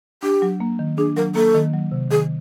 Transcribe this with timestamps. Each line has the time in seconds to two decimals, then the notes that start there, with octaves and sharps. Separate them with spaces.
0.23 D4 G4
0.42 F#3
0.60 A#3
0.79 D#3
0.97 D4 G#4
1.17 F#3 A#4
1.35 A#3 A4
1.54 D#3
1.74 F#3
1.91 C3
2.10 D#3 G#4